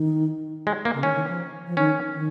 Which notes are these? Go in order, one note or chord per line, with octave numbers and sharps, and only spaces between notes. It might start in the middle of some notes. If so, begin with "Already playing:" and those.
Already playing: D#3
G#3
A#3
C#3
D#3 C#4
D#3
F3
F3
D#3 C#4
D#3